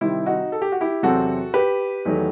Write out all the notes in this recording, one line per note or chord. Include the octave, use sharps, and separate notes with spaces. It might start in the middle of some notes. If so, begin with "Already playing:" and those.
C3 D#3 G3 C4 E4
D#4 F#4
A4
G4
F#4
E4 G4
E2 C3 F#3 C4 F#4 A4
G4 B4
E2 D#3 F#3 A3